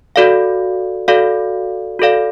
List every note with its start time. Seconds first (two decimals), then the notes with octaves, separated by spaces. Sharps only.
0.16 F#4 A4 D5 F5
1.08 F#4 A4 D5 F5
1.99 F#4 A4 D5 F5